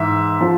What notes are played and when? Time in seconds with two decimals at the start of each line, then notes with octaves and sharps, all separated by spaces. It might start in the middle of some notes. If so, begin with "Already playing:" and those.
Already playing: G#2 E3 E5
0.41 F3